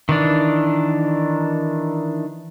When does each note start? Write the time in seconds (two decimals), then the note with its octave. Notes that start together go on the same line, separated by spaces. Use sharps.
0.09 D#3 E3 D4